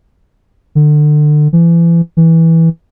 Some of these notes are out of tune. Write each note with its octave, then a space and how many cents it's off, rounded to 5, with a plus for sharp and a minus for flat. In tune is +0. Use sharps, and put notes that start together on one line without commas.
D3 +30
E3 +35
E3 -10